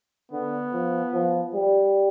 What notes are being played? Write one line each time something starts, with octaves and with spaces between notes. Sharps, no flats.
D3 B3
F3
F3
G3